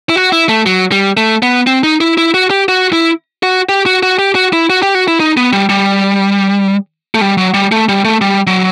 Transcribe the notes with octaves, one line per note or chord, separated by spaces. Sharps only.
E4
F#4
E4
A3
F#3
G3
A3
B3
C4
D#4
E4
E4
F#4
G4
F#4
E4
F#4
G4
F#4
F#4
G4
F#4
E4
F#4
G4
F#4
E4
D#4
B3
G3
G3
A3
G3
F#3
G3
A3
G3
A3
G3
F#3